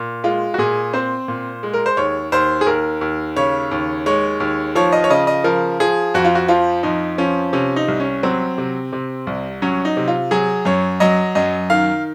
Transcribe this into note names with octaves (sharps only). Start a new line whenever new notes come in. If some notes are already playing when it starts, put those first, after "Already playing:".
Already playing: A#2
G#3 F4
F#4
A#2 G#4
C4 C5
A#2
G#3
A#4
C5
D#2 C#5
D#2 C5
G#4
D#2 A#4
D#2
C#3 C#5
D#2
G#3 C#5
D#2
F3 C#5
D#5
C#5
C#3 D#5
D#5
F3 A#4
F3 G#4
F2 F#4
F4
F#4
F3 F4
F2 D#4
F3 C#4
C3 C#4
D#4
C2
C#4
F#3 C4
C3
C3
C2
F#3 C#4
D#4
C3
F4
F#3 G#4
F#2 C#5
F#3 D#5
F#2 D#5
D#3 F5